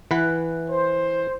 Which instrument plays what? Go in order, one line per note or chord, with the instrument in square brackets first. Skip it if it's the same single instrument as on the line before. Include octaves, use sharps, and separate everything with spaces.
[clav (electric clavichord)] E3 B4 F#5
[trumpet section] C5